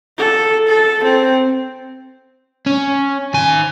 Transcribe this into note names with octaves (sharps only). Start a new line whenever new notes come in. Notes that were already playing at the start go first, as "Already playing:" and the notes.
A4
A4
C4
C#4
D#3 G#5